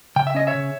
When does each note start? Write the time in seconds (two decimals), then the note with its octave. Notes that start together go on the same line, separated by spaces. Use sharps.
0.16 C#3 G5
0.27 E5
0.35 C#4 D#5
0.47 C#5 E5
0.55 C#3